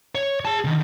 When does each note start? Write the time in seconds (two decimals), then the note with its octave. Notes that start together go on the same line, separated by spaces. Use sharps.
0.15 C#5
0.45 G#4 A5
0.65 D3 D#3